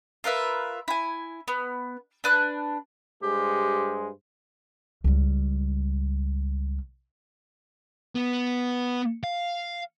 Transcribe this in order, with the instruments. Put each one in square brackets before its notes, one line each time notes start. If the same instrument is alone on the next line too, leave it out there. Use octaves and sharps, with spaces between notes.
[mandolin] F4 A#4 B4 E5
E4 G#5
B3
D4 B4 F#6
[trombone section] G2 G#3 C5 [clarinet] G4
[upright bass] C#2 G3
[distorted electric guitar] B3
F5